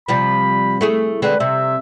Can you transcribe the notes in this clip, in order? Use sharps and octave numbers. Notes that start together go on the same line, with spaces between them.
C3 F3 G3 B5
A3 E4 G#4
D3 G#3 C4 B4
C3 E5